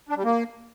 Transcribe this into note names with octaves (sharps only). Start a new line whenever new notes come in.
D4
G3
A#3